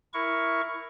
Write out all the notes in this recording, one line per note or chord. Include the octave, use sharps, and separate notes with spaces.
E4 A#4 C#6